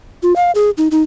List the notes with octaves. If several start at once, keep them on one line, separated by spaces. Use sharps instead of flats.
F4
F5
G#4
D#4
D#4